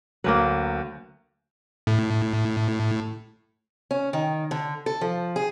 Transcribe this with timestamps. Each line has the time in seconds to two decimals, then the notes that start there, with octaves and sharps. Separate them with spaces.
0.24 D2 F#3 A#3 A#4 B4
1.87 A2
3.91 C#4
4.13 D#3
4.51 D3
4.86 A4
5.01 F3
5.36 G#4